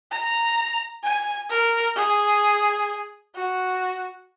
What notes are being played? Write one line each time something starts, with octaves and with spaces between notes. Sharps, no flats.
A#5
G#5
A#4
G#4
F#4